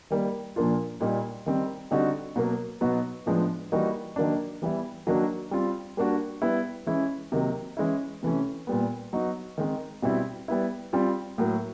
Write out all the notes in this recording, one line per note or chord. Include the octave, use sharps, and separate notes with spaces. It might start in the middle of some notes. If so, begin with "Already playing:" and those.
D#3 G3 A#3
A#2 F3 A#3 D4 F4
A#2 G3 A#3 D#4
D#3 G3 C4
D3 G3 C4 D#4 F#4
B2 F#3 A#3
B2 F#3 B3 D#4 F#4
A2 F3 G#3 B3 D4
E3 G3 A#3 D#4 F#4
D#3 F#3 A#3 D4
E3 G3 B3 E4
D#3 F#3 A#3 D4 F#4
G3 C4 F4
G3 A#3 D4 F#4
G3 B3 E4
E3 G#3 C#4 E4
C3 D#3 F#3 A#3
E3 G#3 C#4 E4
C3 E3 A3 C#4
A#2 G3 B3
F#3 B3 D#4 F#4
D#3 G#3 C4
B2 G3 C4 E4
G3 B3 E4
G3 C4 F4
A2 F#3 A#3